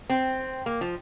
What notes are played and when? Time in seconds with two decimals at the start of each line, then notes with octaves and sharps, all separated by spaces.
0.10 C4
0.66 A#3
0.81 F3